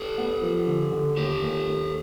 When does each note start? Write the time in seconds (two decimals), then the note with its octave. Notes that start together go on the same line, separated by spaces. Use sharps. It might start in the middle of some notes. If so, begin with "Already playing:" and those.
Already playing: G4 A4
0.18 B3
0.42 F3
0.67 D3
0.91 D3
1.17 D#2 G4 A4
1.42 D#2
1.67 D#2